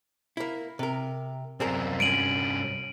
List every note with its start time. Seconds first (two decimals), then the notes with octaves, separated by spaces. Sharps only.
0.37 A#3 E4
0.79 C3 A#4
1.60 C2 F#2 C4 G#4 A#4
2.00 G2 C#4 D7 D#7 F#7